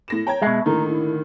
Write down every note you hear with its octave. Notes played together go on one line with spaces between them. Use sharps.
A2 A#6 E7
C#5 G5 A#5 G#6
B2 G#3 E5 A5
A2 D3 D#3 A#3 A#5
E4